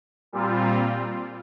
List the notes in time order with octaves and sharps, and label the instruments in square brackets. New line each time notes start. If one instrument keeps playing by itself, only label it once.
[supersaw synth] A#2 G3 C4 F4